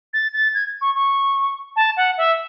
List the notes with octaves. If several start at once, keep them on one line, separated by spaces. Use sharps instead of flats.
A6
A6
G#6
C#6
C#6
A5
F#5
E5